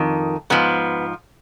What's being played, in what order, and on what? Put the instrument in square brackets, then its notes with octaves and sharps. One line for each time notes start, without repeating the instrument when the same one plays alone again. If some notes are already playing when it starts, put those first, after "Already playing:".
Already playing: [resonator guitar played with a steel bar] F2 D#3
G#2 F3 B3